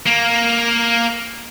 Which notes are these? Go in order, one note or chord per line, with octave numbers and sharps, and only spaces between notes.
A#3